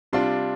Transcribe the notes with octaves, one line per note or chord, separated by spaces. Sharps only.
C3 G3 D4 F4 C6